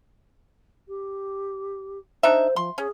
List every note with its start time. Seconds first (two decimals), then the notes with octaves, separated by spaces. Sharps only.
0.88 G4
2.23 D4 D#4 C5 E5
2.56 F3 C6
2.78 C#4 G#4